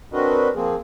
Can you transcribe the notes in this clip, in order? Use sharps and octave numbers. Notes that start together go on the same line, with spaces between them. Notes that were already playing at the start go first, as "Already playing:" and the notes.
C4 D4 F#4 A#4 B4 D#5
F3 A#3 C4 G#4